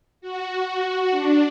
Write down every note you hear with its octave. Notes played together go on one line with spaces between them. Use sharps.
F#4
D4